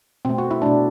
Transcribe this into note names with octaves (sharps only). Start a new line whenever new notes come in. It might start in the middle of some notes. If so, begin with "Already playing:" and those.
B2 A3 C4
F#4
E4
B2 A3 D4